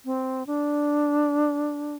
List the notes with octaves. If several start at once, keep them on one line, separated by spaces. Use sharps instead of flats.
C4
D4